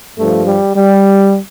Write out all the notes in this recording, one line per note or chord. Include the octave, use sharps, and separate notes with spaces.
G2 F3 A3
G3
G3